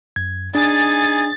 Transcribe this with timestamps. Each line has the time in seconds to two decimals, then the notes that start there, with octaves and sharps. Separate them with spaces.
0.16 F#2 G#6
0.55 D4 D#4 G#4 G#5 A6